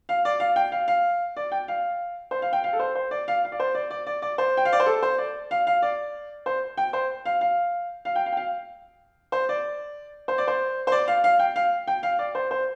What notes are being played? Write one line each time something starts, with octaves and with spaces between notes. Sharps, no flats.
F5
D5
F5
G5
F5
F5
D5
G5
F5
C5
F5
G5
F5
A4
C5
C5
D5
F5
F5
D5
C5
D5
D5
D5
D5
C5
G5
F5
D5
C5
A4
C5
D5
F5
F5
D5
C5
G5
C5
F5
F5
F5
G5
F5
G5
F5
C5
D5
C5
D5
C5
C5
D5
F5
F5
G5
F5
G5
F5
D5
C5
C5